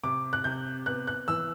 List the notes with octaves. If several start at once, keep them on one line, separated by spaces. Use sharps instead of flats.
C3 D6
F#6
C3 G6
B3 F#6
F#6
E3 E6